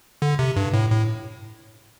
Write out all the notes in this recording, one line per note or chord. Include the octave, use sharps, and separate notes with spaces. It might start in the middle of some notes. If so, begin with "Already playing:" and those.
D3
C3
G2
A2
A2